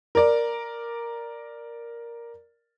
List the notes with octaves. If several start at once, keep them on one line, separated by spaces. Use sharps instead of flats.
A#4 D5